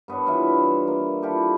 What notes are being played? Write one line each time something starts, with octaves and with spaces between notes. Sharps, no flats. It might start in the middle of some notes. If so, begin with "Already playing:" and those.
G2 B3 D4 C#5
E3 F4 E5
A#3
E4 F4 G4 A4